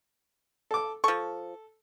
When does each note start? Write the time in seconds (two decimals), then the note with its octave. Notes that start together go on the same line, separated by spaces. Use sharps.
0.71 A4 D6
1.04 F3 A4 C#6